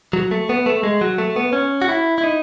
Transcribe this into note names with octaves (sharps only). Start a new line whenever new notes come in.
F#3
A3
B3
A3
G#3
F#3
A3
B3
C#4
F#4
E4
E4
D#4